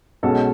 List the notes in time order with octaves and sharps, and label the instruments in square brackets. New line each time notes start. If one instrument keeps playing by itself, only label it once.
[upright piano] B1 B2 G#3 C#4 A4